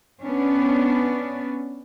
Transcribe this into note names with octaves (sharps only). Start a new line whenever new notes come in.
B3 C#4 D4